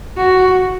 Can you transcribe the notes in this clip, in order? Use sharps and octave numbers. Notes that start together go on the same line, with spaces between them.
F#4